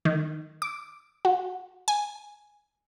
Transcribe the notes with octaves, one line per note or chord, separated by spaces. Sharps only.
D#3
D6
F#4
G#5